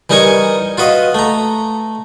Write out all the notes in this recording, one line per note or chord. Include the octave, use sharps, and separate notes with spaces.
E3 G3 D#4 A#4 G#5 C#6
F4 F#4 B4 D#5
A3 A#5